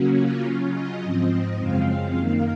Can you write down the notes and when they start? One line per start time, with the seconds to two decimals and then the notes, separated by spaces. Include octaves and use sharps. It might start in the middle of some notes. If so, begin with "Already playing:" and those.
Already playing: C#3 F#3 A#3 C#4 F#4
0.17 F4
0.45 C#3 F#3 C#4
0.73 D#5
1.03 G#2 F3 C4
1.59 F#2 C#3 F3 G#3 C4 F5
1.88 F5
2.17 F#2 D#3 A#3